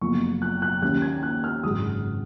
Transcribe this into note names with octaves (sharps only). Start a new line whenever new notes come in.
F#1 F2 F3 B3 F4 C#6
F#6
F#6
D#2 D#3 A#3 C#4 F#6
G#6
F#6
F6
G#1 F#2 C#3 G#3 D#6